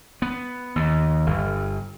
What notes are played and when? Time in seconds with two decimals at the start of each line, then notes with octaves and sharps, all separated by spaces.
0.22 B3
0.76 D#2
1.26 G1